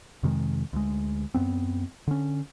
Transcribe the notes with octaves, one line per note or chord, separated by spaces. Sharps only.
F2 C3 D#3 G#3
D2 G#3
F#2 B3 C4
D3 C#4